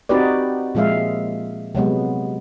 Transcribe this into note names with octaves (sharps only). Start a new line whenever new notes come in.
C4 D#4 F#4 G4 B4 D5
A#2 F3 G#3 E5 F5
C3 F#3 G#3 B3